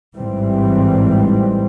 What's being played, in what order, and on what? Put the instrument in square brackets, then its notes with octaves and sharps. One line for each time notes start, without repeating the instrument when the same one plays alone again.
[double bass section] A1 G#2 E3 G3 C4